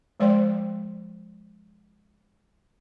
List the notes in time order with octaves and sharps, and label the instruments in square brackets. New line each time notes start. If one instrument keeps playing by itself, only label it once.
[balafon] F3 G#3 C5 D5 G5 C6